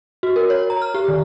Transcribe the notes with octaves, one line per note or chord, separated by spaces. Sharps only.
F#4
A#4
C#5
A#5
F6
G4
D#3